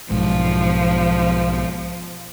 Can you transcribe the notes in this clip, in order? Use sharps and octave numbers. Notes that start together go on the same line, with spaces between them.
B1 G#2 F3